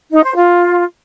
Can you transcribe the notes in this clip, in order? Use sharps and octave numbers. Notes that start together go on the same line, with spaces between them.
D#4
C5
F4